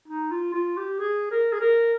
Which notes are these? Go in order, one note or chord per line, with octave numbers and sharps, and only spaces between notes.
D#4
F4
F4
G4
G#4
A#4
G#4
A#4